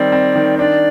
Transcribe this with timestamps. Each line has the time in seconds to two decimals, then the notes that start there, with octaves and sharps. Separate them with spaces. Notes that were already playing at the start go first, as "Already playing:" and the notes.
Already playing: D#3 G3 C4 D5
0.12 C4
0.36 D#3
0.59 D4 D5